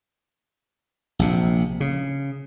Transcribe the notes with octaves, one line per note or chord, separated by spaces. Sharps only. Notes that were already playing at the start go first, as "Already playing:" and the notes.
A#1 C3
C#3